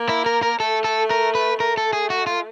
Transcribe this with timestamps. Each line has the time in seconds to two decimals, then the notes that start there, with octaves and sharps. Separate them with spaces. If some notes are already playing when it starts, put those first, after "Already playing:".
Already playing: A#3
0.09 E4
0.26 A#4
0.42 A#4
0.60 A3 A4
0.84 A4
1.10 A#4
1.35 B4
1.60 A3 A#4
1.77 A4
1.93 G#4
2.10 F#4
2.27 F4